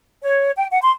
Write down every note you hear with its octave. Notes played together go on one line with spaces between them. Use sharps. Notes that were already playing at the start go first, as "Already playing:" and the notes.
C#5
G5
F#5
C6